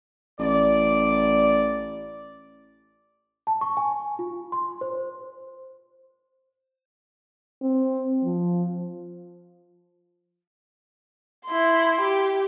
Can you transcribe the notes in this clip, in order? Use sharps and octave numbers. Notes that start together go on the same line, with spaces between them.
A1 D5
A5
C#6
G#5
F4
C6
C5
C4
F3
E4 C6
G4